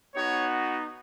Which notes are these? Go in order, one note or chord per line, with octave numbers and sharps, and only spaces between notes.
B3 D#4 F#4 C#5